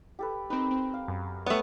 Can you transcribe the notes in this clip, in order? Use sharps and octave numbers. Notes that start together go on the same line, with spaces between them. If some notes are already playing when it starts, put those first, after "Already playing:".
G4 A4 B4
C4 D#4 A#4 B4
C4
F5
F#2
A3 B3 C#5